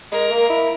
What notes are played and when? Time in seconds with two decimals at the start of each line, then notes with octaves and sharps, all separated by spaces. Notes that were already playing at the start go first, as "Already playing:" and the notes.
0.12 G#3 A#4
0.31 A#3
0.50 E4